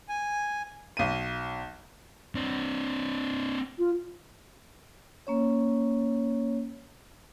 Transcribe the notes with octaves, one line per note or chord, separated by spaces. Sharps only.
G#5
B1 D#7
C4 D4
F4
A#3 C#4 C#5